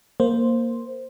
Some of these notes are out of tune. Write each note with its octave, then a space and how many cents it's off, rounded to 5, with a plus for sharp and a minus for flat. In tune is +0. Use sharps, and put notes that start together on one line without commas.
A#3 +0 C5 +0